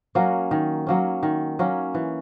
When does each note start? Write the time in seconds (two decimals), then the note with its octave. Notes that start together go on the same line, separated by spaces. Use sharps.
0.15 F#3 A#3 C#4
0.51 D#3
0.87 F#3 A#3 C#4
1.23 D#3
1.59 F#3 A#3 C#4
1.95 E3